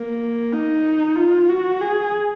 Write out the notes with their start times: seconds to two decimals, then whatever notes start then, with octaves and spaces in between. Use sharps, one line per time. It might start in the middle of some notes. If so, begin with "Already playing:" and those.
Already playing: A#3
0.53 D#4
1.16 F4
1.49 F#4
1.81 G#4